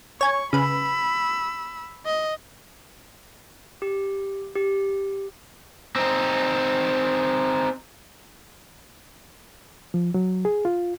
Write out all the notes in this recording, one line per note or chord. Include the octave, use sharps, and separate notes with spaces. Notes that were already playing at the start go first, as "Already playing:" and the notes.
C#5 G#5 C#6
C#3 B4 B5 E6
D#5
G4
G4
C4 D#4
F3
F#3
G#4
F4